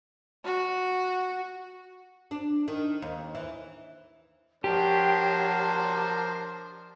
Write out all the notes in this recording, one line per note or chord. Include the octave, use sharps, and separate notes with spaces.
F#4
D4
D#3
D#2
E3
F3 D4 F#4 G4 A#4 C5 C#5 A5